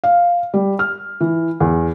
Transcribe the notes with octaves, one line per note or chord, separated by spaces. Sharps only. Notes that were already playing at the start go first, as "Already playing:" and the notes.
F5
G3
F6
E3
E2